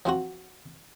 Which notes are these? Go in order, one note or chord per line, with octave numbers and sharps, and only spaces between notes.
F3 C4 F4 F#4